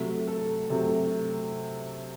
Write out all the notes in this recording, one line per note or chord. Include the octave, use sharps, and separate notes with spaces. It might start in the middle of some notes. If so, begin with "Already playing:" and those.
Already playing: C3 F#3 A3
A4
C3 F#3 A3